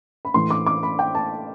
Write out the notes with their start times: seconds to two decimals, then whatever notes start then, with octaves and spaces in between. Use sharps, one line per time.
0.25 B5
0.34 A2 E3 C6
0.50 D6
0.66 D6
0.83 B5
0.99 G5
1.15 A5